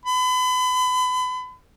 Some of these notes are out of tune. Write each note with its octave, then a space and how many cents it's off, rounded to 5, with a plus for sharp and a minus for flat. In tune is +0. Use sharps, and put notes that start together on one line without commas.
B5 +35